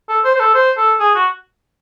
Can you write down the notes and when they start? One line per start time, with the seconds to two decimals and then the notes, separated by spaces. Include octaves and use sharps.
0.09 A4
0.24 C5
0.35 C5
0.40 A4
0.54 C5
0.77 A4
1.00 G#4
1.15 F#4